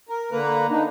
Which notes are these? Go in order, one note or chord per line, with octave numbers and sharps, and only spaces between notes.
A#4
D3 A#3 B4 A#5
D4 D#4